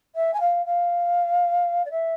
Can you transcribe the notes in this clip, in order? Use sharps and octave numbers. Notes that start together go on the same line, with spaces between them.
E5
G#5
F5
F5
D5
E5